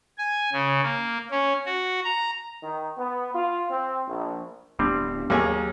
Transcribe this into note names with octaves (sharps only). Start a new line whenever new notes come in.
G#5
C#3
A#3
C#4
F#4
A#5
D#3
B3
F4
C4
A#1
D1 G3 B3 C4 D4
D#2 F#3 A#3 G#4 A#4